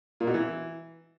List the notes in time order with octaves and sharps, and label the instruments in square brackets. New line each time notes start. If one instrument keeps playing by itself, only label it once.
[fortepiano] A#2
B2
E3